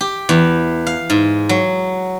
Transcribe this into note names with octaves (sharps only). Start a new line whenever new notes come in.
G4
E2
F5
G#2
F#3